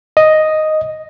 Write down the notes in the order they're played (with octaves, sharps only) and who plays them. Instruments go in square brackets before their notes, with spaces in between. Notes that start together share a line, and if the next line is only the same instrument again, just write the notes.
[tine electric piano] D#5